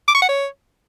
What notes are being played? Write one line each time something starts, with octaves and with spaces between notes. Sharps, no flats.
D6
C#6
F#5
C#5